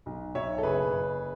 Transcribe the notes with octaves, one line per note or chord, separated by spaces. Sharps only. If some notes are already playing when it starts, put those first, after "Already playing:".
B1
B1 C#5 E5
A4
F#1 G#4 B4
F#1